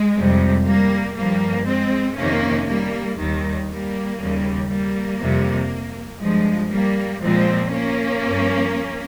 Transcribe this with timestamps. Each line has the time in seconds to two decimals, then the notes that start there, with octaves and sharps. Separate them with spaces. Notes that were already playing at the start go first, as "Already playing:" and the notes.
Already playing: G#3
0.15 F2 C3 G3
0.65 G3 A#3
1.16 G2 F3 G3 A#3
1.67 G#3 C4
2.17 F2 C3 D#3 A#3 C#4
2.68 G3 A#3
3.18 D#2 D#3 G3
3.69 G3 A#3
4.20 D#2 C#3 G3
4.70 G3 A#3
5.20 F2 C3 G3
6.21 G2 F3 G#3
6.71 G3 A#3
7.22 A#2 F3 G#3 C4
7.72 A#3 C#4
8.23 G2 F3